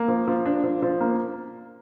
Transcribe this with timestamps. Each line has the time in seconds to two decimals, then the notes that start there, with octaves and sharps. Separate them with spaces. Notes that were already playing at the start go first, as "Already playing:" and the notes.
Already playing: A#3
0.08 F3
0.27 F3
0.46 D4
0.64 F3
0.82 F3
1.01 A#3